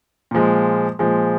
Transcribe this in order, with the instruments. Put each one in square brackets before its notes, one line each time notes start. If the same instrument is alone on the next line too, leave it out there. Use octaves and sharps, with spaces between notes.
[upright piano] A#2 F3 G#3
A#2 F3 G#3